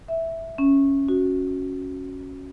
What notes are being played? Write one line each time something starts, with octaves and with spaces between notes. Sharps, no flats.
E5
C#4
F#4